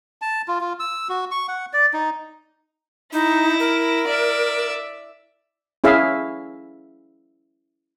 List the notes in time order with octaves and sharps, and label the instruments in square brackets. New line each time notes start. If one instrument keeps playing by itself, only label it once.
[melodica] A5
F4
F4
E6
F#4
C#6
F#5
D5
D#4
[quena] D#4 [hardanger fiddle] E4
[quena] A#4
[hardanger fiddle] D5 E5
[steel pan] C#4 E4 G#4 E5 F5